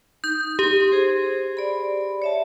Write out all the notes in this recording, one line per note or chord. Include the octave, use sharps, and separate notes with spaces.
D#4 G6
D#4 G4
G#4 C5
D5 B5
C#5 E5 A5